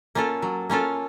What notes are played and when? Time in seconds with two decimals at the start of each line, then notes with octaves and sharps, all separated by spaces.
0.15 A#3 C#4 F4 A4
0.42 F#3
0.70 A#3 C#4 F4 A4